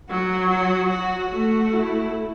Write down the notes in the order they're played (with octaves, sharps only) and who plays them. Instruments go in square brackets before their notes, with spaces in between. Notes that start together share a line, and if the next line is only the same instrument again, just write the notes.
[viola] F#3 [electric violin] F#4
[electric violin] F#4
F#4
[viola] A3 [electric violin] F#4
[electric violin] E4